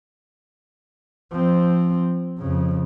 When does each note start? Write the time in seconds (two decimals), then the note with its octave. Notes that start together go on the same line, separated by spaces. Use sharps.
1.31 F3 C4
2.39 F2 C#3